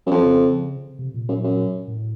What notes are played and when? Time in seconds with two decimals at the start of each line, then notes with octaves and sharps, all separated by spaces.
0.07 F#2
0.11 F2
0.25 C#3
0.99 C3
1.14 A#2
1.29 F#2
1.44 F#2
1.88 A2